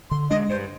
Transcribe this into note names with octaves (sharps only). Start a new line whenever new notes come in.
D3 C6
G#3 D4 D#5
G2 C5